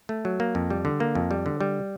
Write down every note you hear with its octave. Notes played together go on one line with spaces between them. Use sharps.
A3
F#3
A#3
F2
G3
D3
A#3
F2
G3
D3
G3